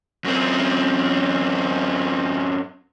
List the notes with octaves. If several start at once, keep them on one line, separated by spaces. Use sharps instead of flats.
F#2 C4